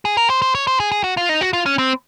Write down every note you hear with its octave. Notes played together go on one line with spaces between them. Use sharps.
G#4
A#4
C5
C5
C#5
C5
G#4
G#4
F#4
F4
D#4
F#4
F4
C#4
C4